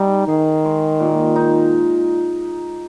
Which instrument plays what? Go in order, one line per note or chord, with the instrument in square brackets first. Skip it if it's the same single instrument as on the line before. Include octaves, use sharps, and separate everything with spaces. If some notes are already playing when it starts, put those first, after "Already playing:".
Already playing: [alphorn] G3 [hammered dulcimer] D#4
[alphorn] D#3 [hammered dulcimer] G#4
[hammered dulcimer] G#3
A#2
D#4